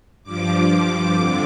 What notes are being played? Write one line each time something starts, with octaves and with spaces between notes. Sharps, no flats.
G2 F3 D6
F2 D3